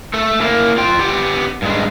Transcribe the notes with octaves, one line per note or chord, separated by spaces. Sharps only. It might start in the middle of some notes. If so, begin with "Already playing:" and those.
A3 A4
A#3 E4
F4 G5
B3 G4
G2 G#3